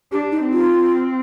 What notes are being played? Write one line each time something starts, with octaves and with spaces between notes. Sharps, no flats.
D4 G4
D#4
C4
F4